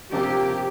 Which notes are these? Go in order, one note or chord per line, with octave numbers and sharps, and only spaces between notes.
C3 F3 A#3 D4 G4